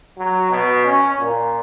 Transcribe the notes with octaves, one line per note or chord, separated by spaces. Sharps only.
F#3
B2
C#4
A#2